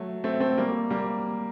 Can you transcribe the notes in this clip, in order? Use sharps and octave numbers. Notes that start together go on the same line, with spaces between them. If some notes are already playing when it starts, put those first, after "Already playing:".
Already playing: F#3 A3
A3 C4
A3 C4
G3 A#3
G3 A#3